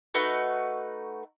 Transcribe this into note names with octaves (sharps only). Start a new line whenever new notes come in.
A3 D#4 F#4 B4